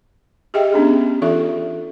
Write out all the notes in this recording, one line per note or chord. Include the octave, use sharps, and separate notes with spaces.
G4 G#4 D#5 E5 G5
B3 C#4 D4 G#4
E3 D#4 F4 A4 E5